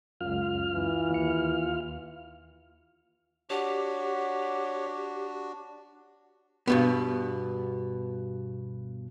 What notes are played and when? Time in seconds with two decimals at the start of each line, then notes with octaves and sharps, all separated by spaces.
0.21 C#2 F#2 F4 F6
0.73 E3
1.10 D#2 C#7
3.50 D4 F#4 G4 C#5 F#5
6.67 G2 B2 B3